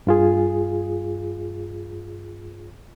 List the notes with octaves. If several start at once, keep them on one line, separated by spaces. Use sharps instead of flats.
G2 F4 G#4